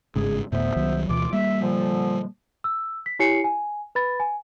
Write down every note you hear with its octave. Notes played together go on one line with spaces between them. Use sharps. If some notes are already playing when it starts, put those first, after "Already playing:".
G1 G#2 C#3 G#4
D1 D2 A2 B3 C5 E5
C2 D#3 F#3
D2 B2 E3 F4 D6
G3 A#3 E5
A#2 D3 F3
E6
B6
E4 G4 C#5 G#5 C7 C#7
G#5
B4 B5 A6
G#5